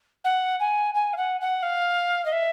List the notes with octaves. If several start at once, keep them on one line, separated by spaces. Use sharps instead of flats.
F#5
G#5
G#5
F5
F#5
F#5
F5
D#5
E5